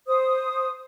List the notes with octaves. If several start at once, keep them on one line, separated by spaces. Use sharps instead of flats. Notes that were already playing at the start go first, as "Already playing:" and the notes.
C5 D#6